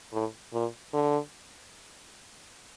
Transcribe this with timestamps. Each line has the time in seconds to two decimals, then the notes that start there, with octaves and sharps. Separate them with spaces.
0.13 A2
0.53 A#2
0.94 D3